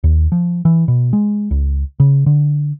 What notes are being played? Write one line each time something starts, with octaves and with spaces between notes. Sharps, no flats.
D#2
F3
E3
B2
G#3
C#2
C#3
D3